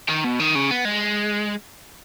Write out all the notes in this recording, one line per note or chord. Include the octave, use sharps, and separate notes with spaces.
D#3
B2
D#3
C#3
B3
G#3